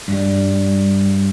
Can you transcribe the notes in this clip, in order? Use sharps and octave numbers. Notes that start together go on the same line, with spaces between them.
G2 G3